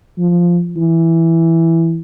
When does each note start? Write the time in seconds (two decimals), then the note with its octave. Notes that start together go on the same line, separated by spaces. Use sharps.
0.18 F3
0.76 E3